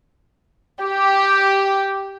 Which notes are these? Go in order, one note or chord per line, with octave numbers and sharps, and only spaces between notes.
G4